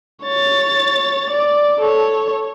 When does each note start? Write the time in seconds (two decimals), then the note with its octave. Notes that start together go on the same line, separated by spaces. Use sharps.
0.23 C#5 A6
1.30 D5
1.81 A4 C#5